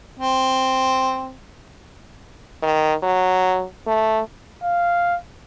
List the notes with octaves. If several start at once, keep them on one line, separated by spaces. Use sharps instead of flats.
C4
D#3
F#3
A3
F5